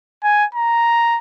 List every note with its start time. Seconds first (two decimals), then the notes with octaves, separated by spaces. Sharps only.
0.23 G#5
0.54 A#5